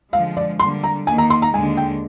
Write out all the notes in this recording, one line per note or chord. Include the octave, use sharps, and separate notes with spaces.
D3 F3 G#3 F5
D5
D3 G3 A#3 C6
A#5
D#3 A#3 D#4 G#5
A#5
C6
A#5
D#2 D3 G#3 G#5
G5